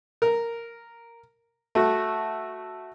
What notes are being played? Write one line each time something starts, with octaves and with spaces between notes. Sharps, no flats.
A#4
A3 F#4